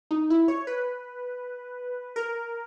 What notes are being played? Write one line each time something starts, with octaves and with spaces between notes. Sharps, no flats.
D#4
E4
C#5
B4
A#4